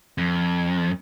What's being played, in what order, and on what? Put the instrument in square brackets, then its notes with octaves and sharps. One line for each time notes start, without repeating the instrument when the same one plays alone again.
[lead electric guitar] F2